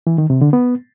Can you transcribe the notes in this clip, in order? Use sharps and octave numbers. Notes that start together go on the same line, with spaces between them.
E3
D#3
C3
D3
B3